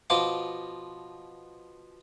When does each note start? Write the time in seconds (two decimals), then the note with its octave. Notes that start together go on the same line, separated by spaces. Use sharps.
0.10 B2 F3 C6 D6